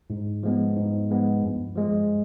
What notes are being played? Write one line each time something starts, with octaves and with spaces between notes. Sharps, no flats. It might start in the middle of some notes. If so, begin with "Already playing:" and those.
G#2
F3 G#3 B3
G#2
F3 G#3 B3
G2
F3 G#3